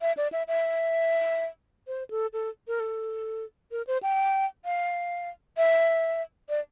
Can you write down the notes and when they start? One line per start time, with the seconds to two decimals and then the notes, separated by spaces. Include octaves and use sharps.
0.02 E5
0.17 D5
0.32 E5
0.48 E5
1.87 C5
2.11 A4
2.33 A4
2.68 A#4
2.80 A4
3.71 A#4
3.87 C5
4.03 G5
4.65 F5
5.57 E5
6.49 D5